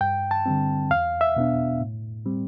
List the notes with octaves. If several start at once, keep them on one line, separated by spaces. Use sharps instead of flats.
G2 G5
A5
D3 G3 C4
E2 F5
E5
B2 B3 D4
A2
G3 C4